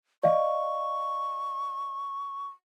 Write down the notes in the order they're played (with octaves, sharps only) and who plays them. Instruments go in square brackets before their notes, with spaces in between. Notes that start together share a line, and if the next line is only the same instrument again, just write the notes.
[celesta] D5 D#5 F5 [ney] C#6